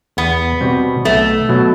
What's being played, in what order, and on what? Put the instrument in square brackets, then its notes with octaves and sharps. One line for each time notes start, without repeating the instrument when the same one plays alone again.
[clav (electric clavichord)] E2 [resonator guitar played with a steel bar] B3
[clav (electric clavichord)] B2 G3 C4 F#4
[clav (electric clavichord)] B1 [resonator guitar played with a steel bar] A3
[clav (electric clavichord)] B2 F#3